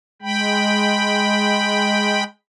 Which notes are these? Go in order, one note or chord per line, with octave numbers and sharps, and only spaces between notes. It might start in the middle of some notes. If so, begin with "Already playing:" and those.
G#3 G5 B5